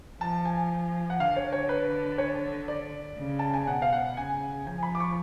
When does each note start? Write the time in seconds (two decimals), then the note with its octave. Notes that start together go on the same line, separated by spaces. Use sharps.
0.20 F3 A5
0.45 G#5
1.10 F#5
1.20 D3 F5
1.36 C#5
1.53 C#5
1.69 B4
2.18 C#5
2.68 D5
3.18 C#3
3.39 A5
3.54 G#5
3.67 B2 F#5
3.82 F5
3.93 F#5
4.17 C#3 G#5
4.66 F3 G#5
4.83 B5
4.95 D6
5.00 C#6